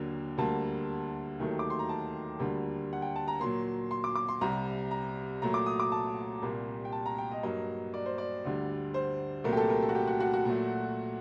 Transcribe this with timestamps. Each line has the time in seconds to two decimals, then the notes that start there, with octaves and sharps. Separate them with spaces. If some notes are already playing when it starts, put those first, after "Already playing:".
Already playing: D#2 D3 F#3 A#3
0.38 D2 D3 G3 A#3 A5
1.39 D#2 D#3 F#3 A3
1.59 D6
1.70 C6
1.79 A#5
1.89 A5
2.39 D2 D3 G3 A#3
2.93 F#5
3.02 G5
3.16 A5
3.28 A#5
3.40 A#2 F#3 A#3 C6
3.91 C6
4.04 D6
4.15 D6
4.28 C6
4.41 C2 C3 G3 A#5
4.91 A#5
5.42 A#2 F#3 A3 A#5
5.54 D6
5.66 D#6
5.80 D6
5.92 A5
6.42 C2 A#2 G3 A#3
6.85 G5
6.92 A5
7.06 A#5
7.18 G5
7.31 D#5
7.43 G2 F#3 A#3 D#5
7.94 D5
8.06 C5
8.18 D5
8.45 D2 D3 G3
8.94 C5
9.44 C2 A#2 F#3 A3 A#4
9.53 G4
9.57 A4
9.70 A#4
9.82 A4
9.89 F#4
9.95 G4
10.07 F#4
10.20 F#4
10.34 F#4
10.45 A#2 F#3 A3